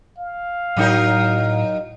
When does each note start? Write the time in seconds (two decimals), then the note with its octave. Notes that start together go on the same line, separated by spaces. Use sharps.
0.18 F5
0.77 A2 F#3 D#4 A#4